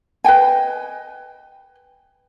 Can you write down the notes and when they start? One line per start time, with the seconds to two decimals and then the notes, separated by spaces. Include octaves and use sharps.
0.24 B4 D#5 G5 G#5